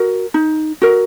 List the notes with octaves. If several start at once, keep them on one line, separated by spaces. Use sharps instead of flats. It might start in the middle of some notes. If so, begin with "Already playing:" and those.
Already playing: F#4 A#4
D#4
F#4 A#4